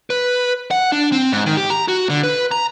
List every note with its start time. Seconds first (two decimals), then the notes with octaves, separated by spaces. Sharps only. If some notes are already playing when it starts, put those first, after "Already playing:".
0.10 B4
0.71 F#5
0.92 D4
1.12 C4
1.32 G#2
1.46 D#3
1.57 G4
1.70 A#5
1.88 F#4
2.10 D3
2.23 B4
2.51 A#5